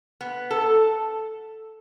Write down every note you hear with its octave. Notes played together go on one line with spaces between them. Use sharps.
B3
A4